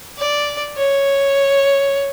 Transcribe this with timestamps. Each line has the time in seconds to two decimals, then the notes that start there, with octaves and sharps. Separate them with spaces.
0.18 D5
0.77 C#5